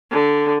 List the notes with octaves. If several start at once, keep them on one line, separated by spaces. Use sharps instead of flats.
D3